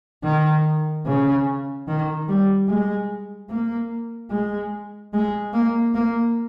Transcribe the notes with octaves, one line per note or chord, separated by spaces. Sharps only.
D#3
C#3
D#3
G3
G#3
A#3
G#3
G#3
A#3
A#3